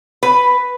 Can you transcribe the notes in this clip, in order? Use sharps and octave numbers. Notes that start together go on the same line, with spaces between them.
B4